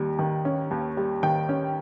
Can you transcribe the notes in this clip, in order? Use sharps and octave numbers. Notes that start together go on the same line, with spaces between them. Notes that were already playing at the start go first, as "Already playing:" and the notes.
Already playing: D#2 D#3 G3
D#3
C#4
D#2
G3
D#3 G5
C#4